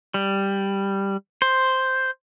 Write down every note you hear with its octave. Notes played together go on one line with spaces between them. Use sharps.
G3
C5